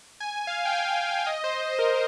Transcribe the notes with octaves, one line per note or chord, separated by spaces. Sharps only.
G#5
F5
G5
G#5
G#5
F5
D#5
C5
C5
C5
A#4